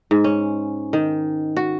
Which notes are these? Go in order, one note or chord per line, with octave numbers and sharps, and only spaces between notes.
G#2
C#4
D#3
F#4